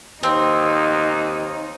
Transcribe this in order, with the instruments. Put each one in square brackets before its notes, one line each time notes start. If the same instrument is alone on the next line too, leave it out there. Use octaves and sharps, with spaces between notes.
[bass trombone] D#2 [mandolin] C4 [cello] D#4